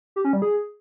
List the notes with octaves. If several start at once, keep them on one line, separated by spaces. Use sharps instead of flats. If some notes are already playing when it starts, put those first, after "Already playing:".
G4
C#4
G3
G#4